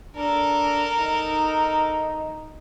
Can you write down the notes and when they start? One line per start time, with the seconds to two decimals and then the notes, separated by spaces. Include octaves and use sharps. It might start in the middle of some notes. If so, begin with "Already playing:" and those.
0.16 D4 A4 A#4
0.98 D#4